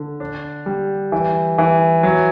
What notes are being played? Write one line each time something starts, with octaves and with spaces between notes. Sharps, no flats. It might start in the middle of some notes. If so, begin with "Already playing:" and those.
Already playing: D3
D4
G3
E3
E3
F#3